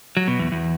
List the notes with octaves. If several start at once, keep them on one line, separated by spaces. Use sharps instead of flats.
F#3
B2
E2
E2